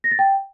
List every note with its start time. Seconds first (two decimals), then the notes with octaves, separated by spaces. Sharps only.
0.04 A#6
0.11 A6
0.19 G5